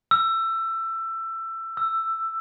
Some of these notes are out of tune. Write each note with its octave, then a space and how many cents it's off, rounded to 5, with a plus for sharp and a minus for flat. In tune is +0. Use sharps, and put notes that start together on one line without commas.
E6 +20
E6 +10